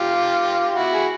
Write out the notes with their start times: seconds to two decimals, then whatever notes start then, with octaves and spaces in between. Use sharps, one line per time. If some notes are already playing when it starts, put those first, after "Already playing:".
Already playing: F4 G4
0.74 E4 F#4
0.93 G#4